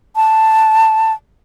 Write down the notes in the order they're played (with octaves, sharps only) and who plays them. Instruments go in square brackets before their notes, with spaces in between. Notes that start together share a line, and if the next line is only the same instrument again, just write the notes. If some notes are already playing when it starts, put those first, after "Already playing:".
[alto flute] A5